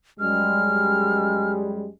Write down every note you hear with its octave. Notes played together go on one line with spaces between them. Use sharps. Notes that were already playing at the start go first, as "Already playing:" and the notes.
F#2 G3 G#3 F6